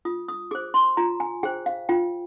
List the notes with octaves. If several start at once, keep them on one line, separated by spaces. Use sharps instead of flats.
F4 D#6
D#6
G#4 C5 D6
C6
F4 A#5
G#5
G#4 C5 G5
F5
F4 G5